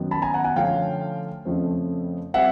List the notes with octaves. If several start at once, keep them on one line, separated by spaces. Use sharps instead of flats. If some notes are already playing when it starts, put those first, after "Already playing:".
Already playing: F#2 D#3 F#3 B3
A5 B5
G#5 A#5
F#5 G#5
F#5 G#5
D3 F3 A3 C#4 F5 G5
F2 C#3 F3 A3 C4
G3 C4 E5 F#5